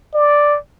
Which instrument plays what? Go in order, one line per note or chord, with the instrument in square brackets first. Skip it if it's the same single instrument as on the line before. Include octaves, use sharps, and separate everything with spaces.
[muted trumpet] D5